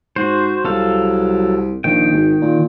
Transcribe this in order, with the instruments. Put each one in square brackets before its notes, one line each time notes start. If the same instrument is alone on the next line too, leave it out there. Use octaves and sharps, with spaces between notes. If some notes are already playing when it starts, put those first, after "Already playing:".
[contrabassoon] G#2 [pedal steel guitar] F#4 C5
[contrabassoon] C2 [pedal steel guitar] F#3 A4 F5
[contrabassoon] A#1 [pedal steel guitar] D#3 G5
[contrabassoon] G#1
A#2